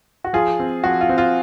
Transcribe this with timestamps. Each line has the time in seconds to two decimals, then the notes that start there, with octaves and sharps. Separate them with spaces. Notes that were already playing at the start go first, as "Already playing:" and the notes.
0.24 F#4
0.33 F3 F4 G#4
0.59 C4
0.84 F3 F#4
1.01 F4
1.09 C4
1.18 F4